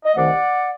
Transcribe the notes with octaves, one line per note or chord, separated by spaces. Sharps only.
D#5
C2 C3 D#3 A3 D5 F#5